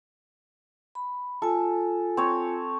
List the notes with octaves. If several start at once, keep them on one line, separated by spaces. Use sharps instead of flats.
B5
F4 A4 G#5
C4 C#5